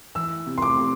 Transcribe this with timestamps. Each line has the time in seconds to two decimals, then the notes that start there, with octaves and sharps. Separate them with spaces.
0.15 E3 E6
0.47 C3
0.58 C6
0.62 D6
0.77 C3